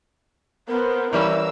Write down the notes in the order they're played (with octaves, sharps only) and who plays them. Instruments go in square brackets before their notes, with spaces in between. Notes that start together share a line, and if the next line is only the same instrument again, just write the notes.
[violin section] B3 C5 [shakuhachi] A#4
[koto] E3 G3 C#4 [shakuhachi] E4 [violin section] A#4 F5 E6